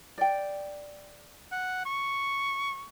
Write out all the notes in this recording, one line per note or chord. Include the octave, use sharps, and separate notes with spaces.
D5 G5
F#5
C#6